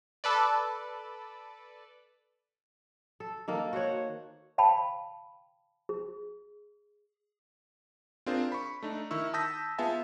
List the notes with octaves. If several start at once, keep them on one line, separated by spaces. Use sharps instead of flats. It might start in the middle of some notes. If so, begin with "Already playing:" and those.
A4 B4 D5
A4
D#3 A#3 A4
F#4 C5 C#5 F#5
F5 G5 A5 B5
G#4
C4 D4 F4 G#4 A#4 C5
B5 C#6
A3 D4 D#4
D#3 E4 C#6 E6
A5 D#6 E6 G6 A#6 B6
B3 F4 G#4 E5 G#5 A5